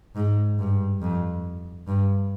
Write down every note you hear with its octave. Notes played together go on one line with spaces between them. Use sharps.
G#2
G2
F2
G2